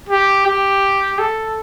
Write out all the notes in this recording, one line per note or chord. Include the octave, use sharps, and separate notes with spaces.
G4
G4
A4